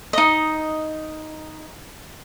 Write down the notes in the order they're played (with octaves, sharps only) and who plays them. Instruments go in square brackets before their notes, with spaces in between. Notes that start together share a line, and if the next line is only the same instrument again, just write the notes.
[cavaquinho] D#4 D#5